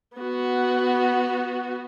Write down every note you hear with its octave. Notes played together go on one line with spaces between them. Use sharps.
B3 F#4